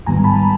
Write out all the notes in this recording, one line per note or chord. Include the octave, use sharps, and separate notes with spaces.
G#2 D#3 G3 B3 G#5 A#5
A5 B5